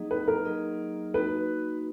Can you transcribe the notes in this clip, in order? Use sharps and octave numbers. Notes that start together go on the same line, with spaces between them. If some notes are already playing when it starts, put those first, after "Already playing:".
Already playing: F#3 A#3 D#4 G#4 D#5
B4
A#4
F#3 A#3 D#4 G#4 D#5
A#3 D#4 F#4 B4